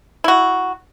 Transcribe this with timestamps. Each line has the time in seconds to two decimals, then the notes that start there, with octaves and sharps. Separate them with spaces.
0.24 E4 F#4